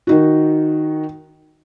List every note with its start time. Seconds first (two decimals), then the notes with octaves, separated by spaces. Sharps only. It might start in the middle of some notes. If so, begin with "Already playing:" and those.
0.07 D#3 D#4 F#4